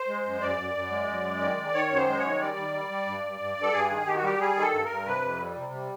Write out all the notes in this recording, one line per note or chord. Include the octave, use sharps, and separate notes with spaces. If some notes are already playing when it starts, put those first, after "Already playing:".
Already playing: C5
G#3
F#2
F#2 D5
F#2
F#2
G#3
F#2
G#3
D#3
D#3
D#3 C#5
F#2
C5
G#3
C#5
D#3
G3 D5
D#3
G3
G3
G2
G2
G2
G2
A4
G2 G#4
D#3
D#3 G4
F#4
G3 G4
G3 G#4
D#3
A4
G2
G2 A#4
C3 B4
F2
G3
C3
G3